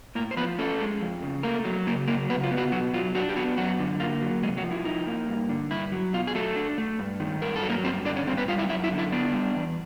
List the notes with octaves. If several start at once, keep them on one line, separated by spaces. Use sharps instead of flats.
A2 A#3 A#4
C5
F3 B3 B4
A3 C#4 A4
G#3
F2
C#3
A3 A#3 A#4
F#3
C#3 A#3 A#4
F#3 A#3 A#4
C#3 B3 B4
F4
B3
F#3 F#4
B2 F#3 F#4
F#3 F4
F#3 D4 F#4
G4
F#3 B3 F#4
F#2 F#3 F#4
D3
A#3 F4
F#3
C3 G#3 G#4
F#3 F#4
F3
E4
D#4
A#3
G2
D3
G2 E4
F#3
B2 F4
G#4
F#3 A3 A4
D4
A3
G2
D#3
G2 A#4
A4
F#3
A#3 A#4
G2 C4 C5
D3 D4 D5
C#4 C#5
G2 C4 C5
B3 B4
G3 F4 F5
E4 E5
F#2 E4 E5
E4 E5
D3
E4 E5
B3 D4 D5
G3
E2